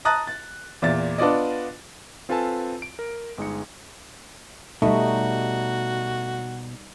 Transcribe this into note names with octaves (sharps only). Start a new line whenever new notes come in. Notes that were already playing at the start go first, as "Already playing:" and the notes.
A5 A#5 D#6 F#6 A6
A6
E2 A#2 E5 A6
B3 D4 F4 D5 D#5
C4 F4 A4 B4 G#5 A5
D7
A#4
G1 G#3 D#4 C#7
B2 G3 A3 D#4 F#4